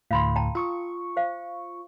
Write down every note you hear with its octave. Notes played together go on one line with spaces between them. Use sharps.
D2 A2 F5 B5 C6
G5 A5 A#5
F4 C#6 D#6 E6
C5 F5